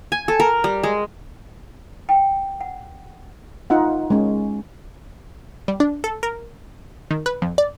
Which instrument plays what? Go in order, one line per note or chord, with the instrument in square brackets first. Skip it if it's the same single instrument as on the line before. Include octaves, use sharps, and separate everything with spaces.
[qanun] G#5
A4
A#4
G3
G#3
[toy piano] G5
F#5
[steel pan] D#4 F4 F#5
G#3 C#4
[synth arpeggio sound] G3
D4
A4
A#4
D#3
B4
F2
D5